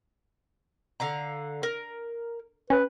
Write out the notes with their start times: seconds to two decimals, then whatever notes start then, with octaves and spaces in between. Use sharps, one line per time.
1.00 D3 F5 A#5
1.63 A#4
2.70 C#4 B4